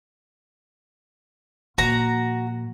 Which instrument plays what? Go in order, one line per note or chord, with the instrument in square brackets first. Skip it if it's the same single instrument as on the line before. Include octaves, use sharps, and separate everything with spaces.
[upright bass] A#2 F3 [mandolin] F#4 A#5